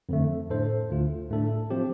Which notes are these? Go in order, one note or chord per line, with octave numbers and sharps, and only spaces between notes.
F2 D3 A3
A2 A3 D4 A4 C5
D2 D3 A3 F4
A2 A3 D4 A4
F3 C4 G4